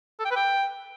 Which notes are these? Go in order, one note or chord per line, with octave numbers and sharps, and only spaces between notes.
A4
G5
B4
G5